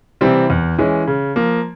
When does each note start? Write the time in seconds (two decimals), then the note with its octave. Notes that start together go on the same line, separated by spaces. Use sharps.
0.21 C3 E3 G3 C4
0.50 E2
0.78 E3 G#3 C#4
1.07 C#3
1.36 F3 A#3